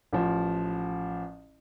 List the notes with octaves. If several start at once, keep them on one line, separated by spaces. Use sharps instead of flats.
A1 F3